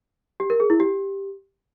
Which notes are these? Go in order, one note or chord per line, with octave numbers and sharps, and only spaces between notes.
G4
A#4
G#4
E4
G4